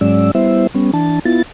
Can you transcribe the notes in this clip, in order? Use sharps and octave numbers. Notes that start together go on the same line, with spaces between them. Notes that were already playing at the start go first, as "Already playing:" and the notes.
G#2 F#3 G#3 C#4 D5 E6
G3 B3 E4 C5 E5
G3 B3 C#4
E3 D4 A5
B3 E4 F4 A6